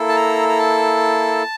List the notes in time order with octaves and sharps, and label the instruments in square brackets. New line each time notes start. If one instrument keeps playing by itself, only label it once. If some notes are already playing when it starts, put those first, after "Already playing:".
Already playing: [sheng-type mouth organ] A#3 E4 A4
A5
A#5
A#5
A5